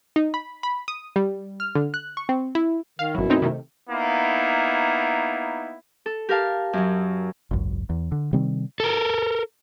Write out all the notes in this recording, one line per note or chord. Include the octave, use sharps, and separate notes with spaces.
D#4
B5
B5
D#6
G3
F6
D3
F#6
C#6
C4
E4
D#3 F5
G#1 F#2 B2 F#3 E4
A3 C4 D#4
C3 D#3 A3
A#3 B3 D#4 E4
A4
G4 A#4 F5 A5
F#2 F#3
G#1 C#2 F#2
E2
D3
C3 D#3 G3 C4
A4 A#4